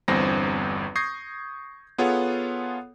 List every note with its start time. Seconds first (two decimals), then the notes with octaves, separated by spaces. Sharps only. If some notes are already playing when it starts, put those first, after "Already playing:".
0.08 G1 E2 G2 C4 C5 A#6
0.95 C#6 D#6 G6 G#6 A#6 C7
1.98 B3 F4 G#4 A4 C#5 F#5